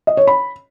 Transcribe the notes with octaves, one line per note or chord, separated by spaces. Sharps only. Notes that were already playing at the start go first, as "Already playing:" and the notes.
D#5
C#5
B5